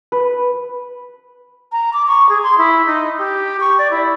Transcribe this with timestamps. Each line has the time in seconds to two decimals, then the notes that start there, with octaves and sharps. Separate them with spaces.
0.12 B4
1.72 A#5
1.93 D6
2.07 C#6
2.29 G#4
2.43 C6
2.58 E4
2.87 D#4
3.18 G4
3.60 C#6
3.78 D5
3.91 E4